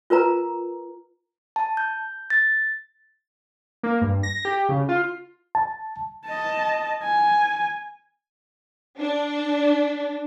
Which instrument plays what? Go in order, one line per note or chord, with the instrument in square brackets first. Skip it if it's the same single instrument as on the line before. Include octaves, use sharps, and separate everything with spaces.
[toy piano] F4 A#4 B4 A#5
[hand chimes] A5
G6
A6
[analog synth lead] A#3
G2
A#6
G4
C#3
F4
[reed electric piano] A5
[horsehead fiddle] D#5 A5
G#5
[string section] D4